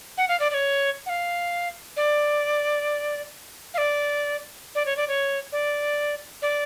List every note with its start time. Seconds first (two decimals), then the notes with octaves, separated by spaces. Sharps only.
0.17 F#5
0.29 F5
0.40 D5
0.51 D5
0.54 C#5
1.06 F#5
1.09 F5
1.96 D5
3.74 F5
3.78 D5
4.75 D5
4.86 C#5
4.97 D5
5.08 C#5
5.52 D5
6.42 D5